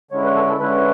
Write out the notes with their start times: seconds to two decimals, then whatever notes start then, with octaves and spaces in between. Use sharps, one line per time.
0.11 D3 G#3 C#4 E4 C#5
0.24 B4
0.35 A4
0.48 A4
0.59 D3 G#3 C#4 E4 B4